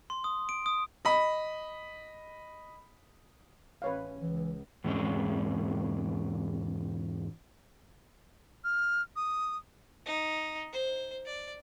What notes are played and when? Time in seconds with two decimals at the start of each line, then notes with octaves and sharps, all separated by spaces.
0.10 C6
0.24 D#6
0.49 D7
0.66 D#6
1.05 D#5 B5
3.82 A1 C#4 B4 C#5 F5
4.21 C#2 E3
4.84 E2 G#2 G#3 C4 C#4
8.64 F6
9.16 D#6
10.06 D#4
10.72 C5
11.26 D5